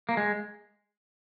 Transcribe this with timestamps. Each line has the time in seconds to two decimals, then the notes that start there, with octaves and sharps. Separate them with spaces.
0.09 A#3
0.17 G#3